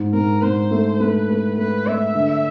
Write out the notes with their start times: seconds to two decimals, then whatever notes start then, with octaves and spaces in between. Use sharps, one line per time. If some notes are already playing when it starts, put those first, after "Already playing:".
Already playing: G#2
0.14 G#2 A#4
0.42 G#2 C5
0.71 A3
1.00 A3 B4
1.29 A3
1.57 A3 B4
1.87 A3 E5
2.15 D3